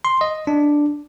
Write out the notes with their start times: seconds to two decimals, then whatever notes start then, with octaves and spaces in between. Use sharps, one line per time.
0.05 C6
0.21 D#5
0.47 D4